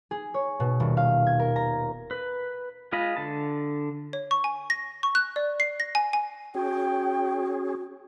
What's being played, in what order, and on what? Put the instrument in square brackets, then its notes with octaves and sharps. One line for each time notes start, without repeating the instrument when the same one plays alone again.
[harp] G#4
C#5
B2
D#1
F5
G#6
A#4
A#5
[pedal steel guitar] B4
G#3 F4 D#5 B5
D3 A5
[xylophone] C#5
C#6
G#5
A#6
C#6
F#6
D5
C7
A#6
G#5
G#5
[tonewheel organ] C#4 G#4 [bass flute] F#4 [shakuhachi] G5